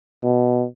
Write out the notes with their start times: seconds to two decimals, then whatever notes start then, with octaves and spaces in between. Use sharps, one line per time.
0.24 B2